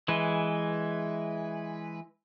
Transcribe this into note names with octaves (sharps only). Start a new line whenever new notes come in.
E3 G#3 B4